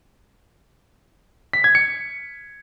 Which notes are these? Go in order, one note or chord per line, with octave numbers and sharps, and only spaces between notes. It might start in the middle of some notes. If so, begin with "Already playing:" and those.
B6
G#6
C#7